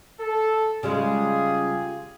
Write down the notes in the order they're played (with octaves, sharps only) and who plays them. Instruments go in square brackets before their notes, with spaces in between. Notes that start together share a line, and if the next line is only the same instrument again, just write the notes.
[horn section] A4
[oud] C#3 G3 G#3 [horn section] F4 G4 G#4